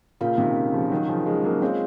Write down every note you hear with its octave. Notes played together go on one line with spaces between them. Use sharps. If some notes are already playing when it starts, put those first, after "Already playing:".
A#2 C#3 C#4 F4 A#4 F5
C3 D#3
C#3 F3
D#3 F#3
C#3 F3
F3 G#3
F#3 A#3
G#3 C4 F4 G#4 C#5 F5